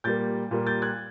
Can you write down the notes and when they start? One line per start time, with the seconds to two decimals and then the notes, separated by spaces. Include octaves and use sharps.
0.04 A#2 G3 A#3 G6 A6
0.51 A#2 G3 A#3
0.67 G6 A6
0.82 F#6 G#6